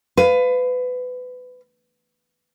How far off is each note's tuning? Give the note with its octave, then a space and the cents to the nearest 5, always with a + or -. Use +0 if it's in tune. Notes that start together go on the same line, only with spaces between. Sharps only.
B4 +25 F5 +0